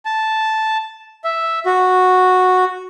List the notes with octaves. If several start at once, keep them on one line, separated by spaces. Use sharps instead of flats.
A5
E5
F#4